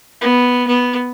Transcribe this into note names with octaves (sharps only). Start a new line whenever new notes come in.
B3
B3